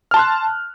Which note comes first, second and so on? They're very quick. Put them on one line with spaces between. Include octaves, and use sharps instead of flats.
F6 A5 C6 F#6